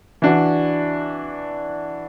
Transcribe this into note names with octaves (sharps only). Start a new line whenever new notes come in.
E3 D4 F#4